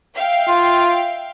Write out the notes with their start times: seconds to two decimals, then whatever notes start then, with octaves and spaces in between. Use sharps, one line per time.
0.16 E5 F5 G5
0.48 F4